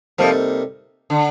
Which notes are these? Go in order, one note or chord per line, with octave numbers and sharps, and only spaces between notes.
F2 C3 F3 G3 A#3 D#4 A4
D3